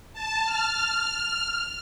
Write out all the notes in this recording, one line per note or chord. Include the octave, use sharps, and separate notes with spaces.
A5
F6